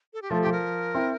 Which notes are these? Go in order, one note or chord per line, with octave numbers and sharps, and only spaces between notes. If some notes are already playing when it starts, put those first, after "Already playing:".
A4
G4
F3 A3 F4
F3 G4
A#4
C4 E4